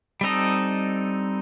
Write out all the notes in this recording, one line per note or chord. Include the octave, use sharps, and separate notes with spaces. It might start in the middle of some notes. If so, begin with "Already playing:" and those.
G3 C4 D#4 A4 D#5